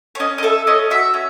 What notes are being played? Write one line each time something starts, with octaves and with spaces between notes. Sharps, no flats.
C#5
C#4 D#5
D#5
A4 E5
C#4 D#5
F#4 E5
C#4